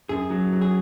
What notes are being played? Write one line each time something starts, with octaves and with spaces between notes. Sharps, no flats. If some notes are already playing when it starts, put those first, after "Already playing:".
F#2 G#4
F#3
F#3
G#4